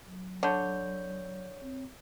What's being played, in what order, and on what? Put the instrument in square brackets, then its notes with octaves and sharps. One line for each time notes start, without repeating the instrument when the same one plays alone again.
[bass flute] F#3
[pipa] D3 [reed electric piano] C#5 G6
[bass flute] C4